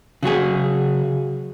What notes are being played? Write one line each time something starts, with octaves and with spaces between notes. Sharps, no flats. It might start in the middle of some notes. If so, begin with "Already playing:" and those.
C#3 F#3 F#4 G#4